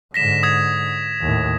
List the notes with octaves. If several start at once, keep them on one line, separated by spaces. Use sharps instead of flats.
G#2 D3 A#6 B6 E7
D#6 G#6
D#2 A2